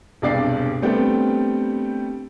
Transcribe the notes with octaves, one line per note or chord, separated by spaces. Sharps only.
E1 C2 G2 D5 D6 C7
G3 A3 B3 C4 D4 G4